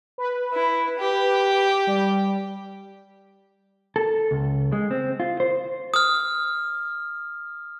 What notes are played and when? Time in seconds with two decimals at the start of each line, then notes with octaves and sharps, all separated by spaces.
0.18 B4
0.53 E4
0.99 G4
1.87 G3
3.96 A4
4.31 C#2
4.72 G#3
4.91 C4
5.20 F4
5.40 C5
5.94 D#6 F6